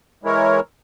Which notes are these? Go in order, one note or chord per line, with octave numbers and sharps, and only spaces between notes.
E3 G#3 E4 A#4 C#5